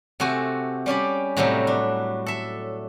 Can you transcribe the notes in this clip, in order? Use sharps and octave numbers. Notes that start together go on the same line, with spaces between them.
C3 A3 F#4 G#5
G3 C#4 G4 D5
A2 C3 F#3 G3 A3 D#4
D4
A4 E5